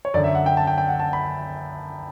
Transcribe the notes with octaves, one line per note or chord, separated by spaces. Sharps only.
C#5
F#2 D3 D5
E5
F#5
G5
A5
G5
G5
F#5
A5
B5